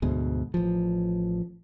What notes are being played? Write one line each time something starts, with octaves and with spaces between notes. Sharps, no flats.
D2 G#2 B2
A1 F3